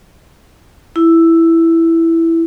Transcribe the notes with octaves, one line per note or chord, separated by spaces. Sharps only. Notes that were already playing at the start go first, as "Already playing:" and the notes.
E4